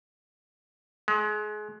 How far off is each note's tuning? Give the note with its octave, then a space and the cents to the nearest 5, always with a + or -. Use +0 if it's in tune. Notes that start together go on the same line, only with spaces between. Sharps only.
G#3 +30